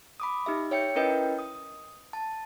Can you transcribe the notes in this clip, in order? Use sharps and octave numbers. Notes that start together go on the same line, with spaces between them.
B5 D6 D#6
D#4 G4 E5
C#5 E5 G5 C#7
C#4 E4 A#4 B4 D#5 G5
D#6
A5